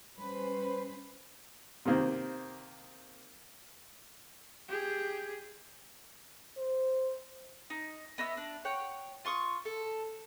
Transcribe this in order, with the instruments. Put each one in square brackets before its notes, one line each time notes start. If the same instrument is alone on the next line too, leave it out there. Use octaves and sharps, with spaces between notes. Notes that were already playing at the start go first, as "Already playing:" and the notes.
[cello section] G3 C#4 B4 C5
[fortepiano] C3 D#3 A#3 C4
[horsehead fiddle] G4 G#4
[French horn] C5
[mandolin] D#4
B3 D#5 E5 E6
D4
C#5 F#5 G5
F4 C6 C#6 D#6
A4